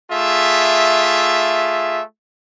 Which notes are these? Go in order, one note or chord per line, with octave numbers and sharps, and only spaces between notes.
A3 F4 G#4 E5